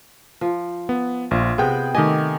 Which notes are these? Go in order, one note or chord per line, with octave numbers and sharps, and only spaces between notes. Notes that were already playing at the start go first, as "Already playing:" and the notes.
F3
B3
A#1 F4
C3 B3 G#4 G5
D#3 A3 G4 D#5 G#5